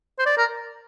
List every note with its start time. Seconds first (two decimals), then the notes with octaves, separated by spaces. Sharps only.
0.19 C5
0.26 D5
0.37 A#4